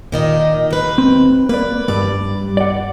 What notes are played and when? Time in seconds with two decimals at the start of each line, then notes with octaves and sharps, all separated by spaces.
0.12 A#2 D#3 D#5
0.71 D#2 B4
0.98 C4
1.49 A#3 B4 D5
1.88 G2 G3 D5
2.57 D5 F#5